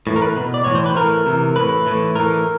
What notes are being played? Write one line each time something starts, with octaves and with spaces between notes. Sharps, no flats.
A2 E3
A#4
B4
B2
D5
A2 E3 C#5
C5
B4
A2 E3 A#4
C3 E3
A2 E3 B4
A2 E3
A2 E3 A#4